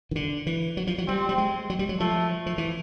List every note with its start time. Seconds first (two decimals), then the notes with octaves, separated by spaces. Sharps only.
0.11 D#3
0.16 D3
0.46 E3
0.77 F#3
0.87 F3
0.98 F#3
1.08 G3 C4
1.29 G3
1.38 G#3
1.70 F#3
1.79 G3
1.89 F#3
2.00 F3 A3
2.46 F3
2.58 E3